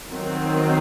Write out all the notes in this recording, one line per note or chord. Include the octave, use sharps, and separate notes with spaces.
D#3 F#3 C4